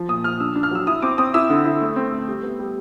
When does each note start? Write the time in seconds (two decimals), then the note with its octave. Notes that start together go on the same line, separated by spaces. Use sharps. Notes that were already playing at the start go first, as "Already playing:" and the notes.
Already playing: F3
0.08 A#2 D#6
0.24 F3 F6
0.40 D4 E6
0.56 D4
0.63 F6
0.71 F#3 E6
0.87 E4 D#6
1.02 C4 D6
1.18 C4 D#6
1.34 E4 E6
1.50 D3
1.65 E4
1.81 A3
1.96 C4
2.12 A3
2.27 G3
2.43 B3
2.59 G3